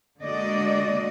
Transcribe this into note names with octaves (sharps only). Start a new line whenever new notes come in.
D3 G#3 A#3 F#4 D5 D#5